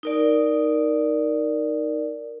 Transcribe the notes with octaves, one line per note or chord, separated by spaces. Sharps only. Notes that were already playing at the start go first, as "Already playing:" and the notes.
D#4 A#4 D5